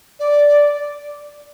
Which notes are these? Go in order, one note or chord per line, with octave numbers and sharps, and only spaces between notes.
D5